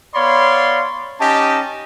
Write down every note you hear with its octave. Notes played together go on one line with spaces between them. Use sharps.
B3 C#5 D5 F5 B5 C6
C#4 D#4 G4 D#5 A5